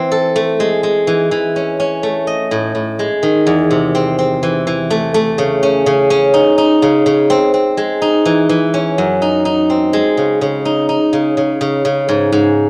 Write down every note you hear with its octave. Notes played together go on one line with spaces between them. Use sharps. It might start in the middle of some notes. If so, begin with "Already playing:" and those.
Already playing: E3 C4
A4
A3
G#3
G#3
E3
E3
C#4
C#4
A3
D#5
A2
A2
G#3
D#3
E2
C3
C4
C4
E3
E3
A3
A3
C#3
C#4
C#3
C#4
D#4
D#4
C#3
C#3
C4
C4
G#3
D#4
E3
E3
C#4
F#2
D#4
D#4
C4
G#3
C#3
C#3
D#4
D#4
C#3
C#3
C#3
C#3
G#2
G#2